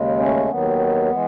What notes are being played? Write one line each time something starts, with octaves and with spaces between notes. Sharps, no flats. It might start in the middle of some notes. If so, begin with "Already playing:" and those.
Already playing: D#2 C#3 G#3
A3 C#4
D#2 D#3 F#3 B3
E3 G#3